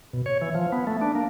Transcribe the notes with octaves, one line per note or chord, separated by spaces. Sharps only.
B2
C#5
E3
F3
B3
A3
D4
A#3